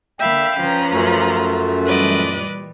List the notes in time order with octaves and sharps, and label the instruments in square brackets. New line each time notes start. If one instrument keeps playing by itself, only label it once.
[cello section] D3 A#3 [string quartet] E5 F5 B5 [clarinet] G5
[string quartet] F3 A#5 [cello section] C#4 B4
[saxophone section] F#2 A3 [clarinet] F4
[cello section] A#2 E3 G3 [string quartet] B4 D5 D#5